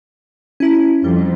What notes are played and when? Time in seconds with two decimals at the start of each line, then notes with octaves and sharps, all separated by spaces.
0.60 C#4 E4
1.04 F2 G3